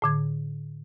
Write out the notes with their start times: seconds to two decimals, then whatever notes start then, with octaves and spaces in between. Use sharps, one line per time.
0.02 A2 D3 G#6